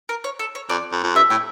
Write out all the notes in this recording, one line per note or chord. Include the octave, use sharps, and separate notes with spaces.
A#4
C#5
A4
C#5
F2 D5
F2
F2
G2 E5
A2 G5